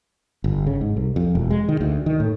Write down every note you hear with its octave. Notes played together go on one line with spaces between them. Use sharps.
G1
C#3
G#2
C2
F2
E1
G#3
D#3
D2
D#3
A2